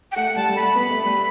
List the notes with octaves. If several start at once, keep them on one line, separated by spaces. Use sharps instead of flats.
G5
A3 F#5
G3 A5
G3
A3 B5
B3
A3
G3